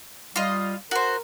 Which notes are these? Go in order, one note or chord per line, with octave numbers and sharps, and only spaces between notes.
G3 F4 D#5
F#4 A#4 C5